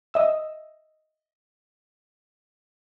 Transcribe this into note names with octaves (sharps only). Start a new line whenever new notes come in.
D#5 E5 E6